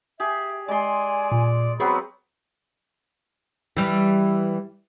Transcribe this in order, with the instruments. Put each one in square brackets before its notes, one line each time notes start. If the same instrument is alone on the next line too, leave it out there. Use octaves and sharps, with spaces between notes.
[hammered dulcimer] G4 G#4 [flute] E5
[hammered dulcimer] G#3 C6 [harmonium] D5 [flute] G#5
[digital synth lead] A#2
[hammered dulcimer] F#3 B3 C4 [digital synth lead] G#4 [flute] B5
[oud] E3 G3